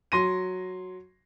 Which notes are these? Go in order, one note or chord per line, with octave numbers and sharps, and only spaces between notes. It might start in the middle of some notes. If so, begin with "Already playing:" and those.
F#3 C6 A#6 D#7